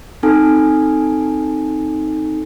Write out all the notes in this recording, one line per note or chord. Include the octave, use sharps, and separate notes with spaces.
C4 D#4 A4 G#5